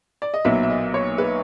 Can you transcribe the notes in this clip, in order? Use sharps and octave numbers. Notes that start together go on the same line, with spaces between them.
D5
D#5
B1 A#2 F#3 B3 E5
E5
D#5
C#5
B4